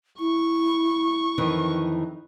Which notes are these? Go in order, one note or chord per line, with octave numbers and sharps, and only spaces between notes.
E4 C#6
F2 D#3 E3